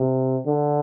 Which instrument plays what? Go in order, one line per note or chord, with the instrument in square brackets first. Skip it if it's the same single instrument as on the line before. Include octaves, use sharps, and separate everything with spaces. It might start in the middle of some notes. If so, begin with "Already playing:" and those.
Already playing: [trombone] C3
D3